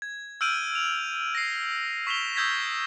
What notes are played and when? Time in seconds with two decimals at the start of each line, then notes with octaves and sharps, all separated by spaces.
0.02 G#6
0.41 E6 F6 G6 D7 D#7 F#7
0.75 F7
1.35 A#6 C7
2.07 C#6 B6 E7 F7 G7
2.36 D#6 E6 G6 G#6 A#6 B6